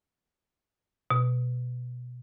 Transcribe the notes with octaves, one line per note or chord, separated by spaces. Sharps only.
B2